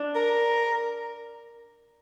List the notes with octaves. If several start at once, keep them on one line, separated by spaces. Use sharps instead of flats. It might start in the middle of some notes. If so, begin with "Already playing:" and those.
Already playing: D4
A#4